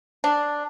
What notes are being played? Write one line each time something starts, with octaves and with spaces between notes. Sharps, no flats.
D4